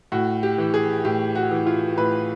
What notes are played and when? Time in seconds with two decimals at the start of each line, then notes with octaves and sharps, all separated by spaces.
0.12 A2 F#4
0.43 G4
0.58 E3
0.74 G#4
1.05 A2 G4
1.35 F#4
1.51 E3
1.67 F4
1.98 A2 B4